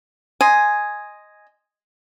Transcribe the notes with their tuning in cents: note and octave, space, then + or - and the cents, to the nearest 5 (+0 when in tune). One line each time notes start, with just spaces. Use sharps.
D#5 +0 G#5 +0 C6 +0